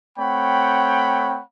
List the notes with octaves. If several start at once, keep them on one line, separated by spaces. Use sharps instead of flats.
A3 C4 C#5 F#5 G5 B5